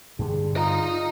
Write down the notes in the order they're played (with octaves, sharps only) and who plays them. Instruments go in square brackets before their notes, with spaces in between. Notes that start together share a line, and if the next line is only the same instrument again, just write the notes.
[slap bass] G2 D3 [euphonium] G#4
[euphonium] F4 [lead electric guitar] D#5 A#5